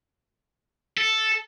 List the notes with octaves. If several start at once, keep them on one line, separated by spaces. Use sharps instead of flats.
A4